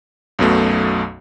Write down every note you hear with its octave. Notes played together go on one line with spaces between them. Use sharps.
B1 F#2 B2 A3